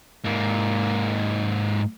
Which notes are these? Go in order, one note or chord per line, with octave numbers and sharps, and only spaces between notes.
G#2 A#3